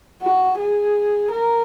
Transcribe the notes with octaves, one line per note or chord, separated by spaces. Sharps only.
F#4
G#4
A#4